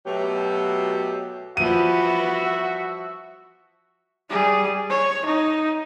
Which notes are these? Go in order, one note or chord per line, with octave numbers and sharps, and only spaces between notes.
B2 F#3 A3 G4
E3 F3 G3 B3 F#4 E5 D#7
G3 G#4
C#5
D#4